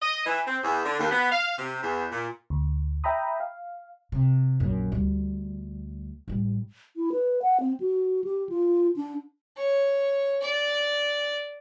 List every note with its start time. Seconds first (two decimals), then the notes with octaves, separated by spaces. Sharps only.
0.02 D#5
0.26 E3
0.47 C4
0.63 E2
0.85 D3
0.99 D#2
1.11 B3
1.31 F5
1.58 C3
1.83 E2
2.11 A#2
2.50 D2
3.04 E5 G5 A#5 B5 D#6
3.40 F5
4.12 C3
4.60 A#1 F#2
4.92 D2 G3
6.28 A1 G3
6.96 E4
7.12 B4
7.42 F#5
7.60 C4
7.80 F#4
8.24 G4
8.49 F4
8.96 D4
9.56 C#5
10.41 D5